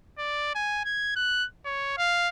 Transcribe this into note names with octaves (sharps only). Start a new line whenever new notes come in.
D5
G#5
G#6
F#6
C#5
F5